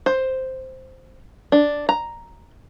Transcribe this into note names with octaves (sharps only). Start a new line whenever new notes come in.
C5
D4
A#5